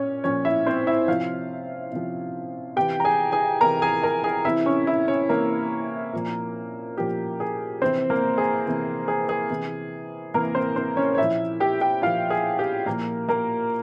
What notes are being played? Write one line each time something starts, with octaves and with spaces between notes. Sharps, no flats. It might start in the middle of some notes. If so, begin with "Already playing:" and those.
Already playing: A#2 C#4 C#5
A#2 F3 C#4 C#5
E4 E5
C4 C5
E4 E5
C3 F3 F4 F5
C3 F3
C3 E3 G4 G5
A#5
G#4 G#5
G#4 G#5
C3 E3 A#4 A#5
G#4 G#5
A#4 A#5
G#4 G#5
C3 E3 E4 E5
C#4 C#5
E4 E5
C#4 C#5
C3 E3 A#3 A#4
A#2 F3
A#2 F3 G4
G#4
C3 E3 C4 C5
A#3 A#4
G#4
C3 E3
G#4
G#4
C3 E3
C3 E3 A#3 A#4
C4 C5
C4 C5
C#4 C#5
C#5
A#2 F3 E4 E5
G4 G5
G4 G5
A#2 F3 F4 F5
G#4
G4
A#2 F3 A#3 A#4
A#3 A#4